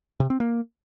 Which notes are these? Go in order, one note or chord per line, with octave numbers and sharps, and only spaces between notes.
C3
C4
A#3